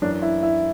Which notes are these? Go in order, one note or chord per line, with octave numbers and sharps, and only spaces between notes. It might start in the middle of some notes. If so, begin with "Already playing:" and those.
F#2 E3 D4
E4
E4